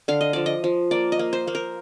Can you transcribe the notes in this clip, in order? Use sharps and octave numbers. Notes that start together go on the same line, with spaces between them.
D3 F5
D#5
F3 D5
D#5
F3
A#3 D5
D#5
A#3
C5
A#3
A#4